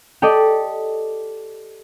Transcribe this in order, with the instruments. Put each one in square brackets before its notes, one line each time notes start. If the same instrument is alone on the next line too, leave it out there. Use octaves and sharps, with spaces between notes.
[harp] G4 A4 D5 D#5